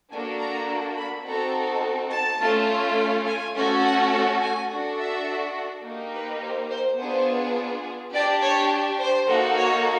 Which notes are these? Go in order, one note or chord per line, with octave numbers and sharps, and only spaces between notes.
A#3 D4 F#4 A4 G#5
A#5
B5
C4 D#4 F#4 A4 A#5
A5
A3 C#4 F4
G#5
A3 C#4 F#4 A4
F#5
F#5
G#5
D4 F#4 A4
E5
A#3 D#4 G4
B4
C5
C5
B3 D4 F4 G#4 C5
D4 G4 D5
C#5
C5
A#3 D#4 F#4 A4
C#5